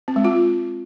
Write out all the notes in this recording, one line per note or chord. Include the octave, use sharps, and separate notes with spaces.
C4
G#3
F4